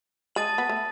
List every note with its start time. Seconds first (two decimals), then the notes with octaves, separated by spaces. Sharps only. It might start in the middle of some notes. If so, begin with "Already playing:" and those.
0.35 G#3 A5 D#6 A6 D#7 F#7
0.58 B3
0.69 A3